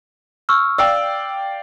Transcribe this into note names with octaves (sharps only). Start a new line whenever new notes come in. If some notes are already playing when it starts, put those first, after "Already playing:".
C#6 E6 F6
D5 F5 G5 E6